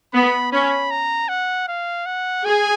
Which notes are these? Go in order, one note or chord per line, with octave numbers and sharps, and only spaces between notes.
B3 B5
C#4 B5
A#5
F#5
F5
F#5
G#4 G#5